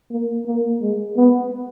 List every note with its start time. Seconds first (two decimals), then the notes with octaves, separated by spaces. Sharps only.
0.11 A#3
0.46 A#3
0.81 G#3
1.17 B3